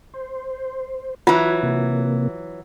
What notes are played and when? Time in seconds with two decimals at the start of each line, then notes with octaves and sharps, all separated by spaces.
0.14 C5
1.27 E3 F#3 F4
1.63 C3 A#3